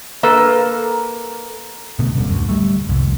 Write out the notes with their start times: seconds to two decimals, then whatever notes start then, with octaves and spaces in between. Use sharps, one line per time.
0.23 A#3 A4 B4
1.99 B2 D3 A3 B3
2.16 D1 F#2 D3 G3
2.31 D2
2.49 G3 A3
2.89 C2 F2 G#2